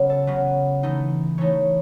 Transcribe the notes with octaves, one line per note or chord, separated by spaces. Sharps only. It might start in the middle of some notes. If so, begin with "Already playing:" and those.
Already playing: C#3 F#3 B3
A4
C#3 F#3 B3
E3 A3 D#4
E3 A3 D#4 C#5